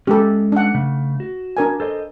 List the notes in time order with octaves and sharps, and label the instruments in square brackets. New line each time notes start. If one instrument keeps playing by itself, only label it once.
[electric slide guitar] G#3 C#4 [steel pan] G4 A4
[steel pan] D4 F#5
[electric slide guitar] C#3 A3
F#4
[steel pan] D4 A#4 G#5
[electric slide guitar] A4 C5 D#5